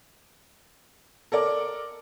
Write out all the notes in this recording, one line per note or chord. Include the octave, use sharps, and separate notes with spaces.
A4 A#4 D5